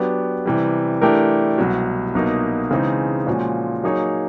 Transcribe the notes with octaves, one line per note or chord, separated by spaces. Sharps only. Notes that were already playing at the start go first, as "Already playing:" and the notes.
Already playing: F#3 B3 D4 G4
C3 E3 G3
E3 A3 D4 G4 A#4
C2 B2 F#3
C2 B2 F#3 A#3 D#4
C#3 E3 G#3 C4 D#4
A#2 F3 G#3 C#4 F#4
F#3 A#3 D#4 G#4 C#5